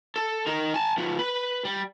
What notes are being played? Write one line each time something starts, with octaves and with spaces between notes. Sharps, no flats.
A4
D#4 A#4
G#5 A5
F3 B3
B4
G3